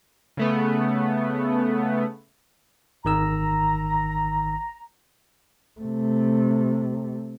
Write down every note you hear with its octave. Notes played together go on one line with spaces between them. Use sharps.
C#3 A3 B3
G#1 D#3 A#5 E6
C3 A3